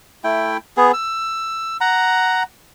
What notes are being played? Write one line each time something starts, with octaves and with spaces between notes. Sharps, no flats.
A3 E4 G5
B3 G#4
E6
F#5 A#5